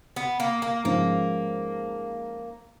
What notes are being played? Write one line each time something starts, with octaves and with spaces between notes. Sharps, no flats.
B3
A#3
A#3
G#2 F3 G#3 A#3 C#4